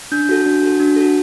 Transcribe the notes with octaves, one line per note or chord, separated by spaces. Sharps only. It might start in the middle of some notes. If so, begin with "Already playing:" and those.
D4 G6
F#4 A4
D4
F#4 A4
D4
F#4 A4